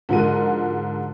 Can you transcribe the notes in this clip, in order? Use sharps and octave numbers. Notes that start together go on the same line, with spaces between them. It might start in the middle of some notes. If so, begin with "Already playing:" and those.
G#2 D3 F3 F#4 A#4 D#7